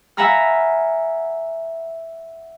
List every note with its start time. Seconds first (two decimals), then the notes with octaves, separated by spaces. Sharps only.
0.17 E5 F#5 G#5 A#5 B5 F6